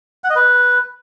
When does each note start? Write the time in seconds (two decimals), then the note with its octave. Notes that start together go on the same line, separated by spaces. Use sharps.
0.24 F#5
0.30 D#5
0.36 B4